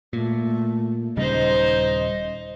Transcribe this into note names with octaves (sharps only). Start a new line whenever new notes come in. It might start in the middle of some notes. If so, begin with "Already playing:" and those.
A#2 A3
D#1 C#3 G3 D#4 C5 D#5